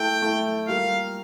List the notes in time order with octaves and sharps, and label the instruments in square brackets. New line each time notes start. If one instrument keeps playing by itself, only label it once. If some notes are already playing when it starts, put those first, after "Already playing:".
Already playing: [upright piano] A3 E4 A4 [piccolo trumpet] G5
[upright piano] A3 E4 A4
[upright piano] G3 A#3 F4 [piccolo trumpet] F5